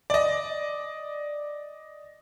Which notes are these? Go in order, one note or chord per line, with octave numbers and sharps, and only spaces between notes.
D5 D#5